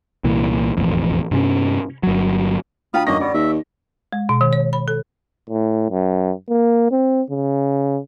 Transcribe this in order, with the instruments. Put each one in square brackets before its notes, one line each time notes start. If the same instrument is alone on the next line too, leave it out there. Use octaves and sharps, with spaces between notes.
[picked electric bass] C2 A#2 E3
E1 A1 F2
G2 C3 C#4
G1 F#3
[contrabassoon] D2 [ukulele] F4 G5 A#5 [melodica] F5 B5 D#6
[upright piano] F#2 D#4 A#6 [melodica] A#3 F#4 D#5 [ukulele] C#4
[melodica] G3 B3 [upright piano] D5 C#6
[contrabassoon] D#2 [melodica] E5
[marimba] G#3
B2
D#3
C#5
B5
A4
[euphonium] A2
F#2
A#3
C4
C#3